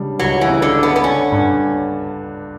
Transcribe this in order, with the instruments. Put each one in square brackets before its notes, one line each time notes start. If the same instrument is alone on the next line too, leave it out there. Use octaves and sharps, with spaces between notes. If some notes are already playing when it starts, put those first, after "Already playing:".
Already playing: [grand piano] C#3 G3 D4
[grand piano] C#2 [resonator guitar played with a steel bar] F#3
[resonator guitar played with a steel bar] E3
[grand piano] C#3
[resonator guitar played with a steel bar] D3
[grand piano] D4
[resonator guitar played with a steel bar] B3
B3
[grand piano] D3 [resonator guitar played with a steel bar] C#4
[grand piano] G2